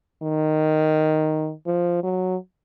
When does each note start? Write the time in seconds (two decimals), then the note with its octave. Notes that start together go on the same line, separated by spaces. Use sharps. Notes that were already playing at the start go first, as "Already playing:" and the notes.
0.22 D#3
1.66 F3
2.03 F#3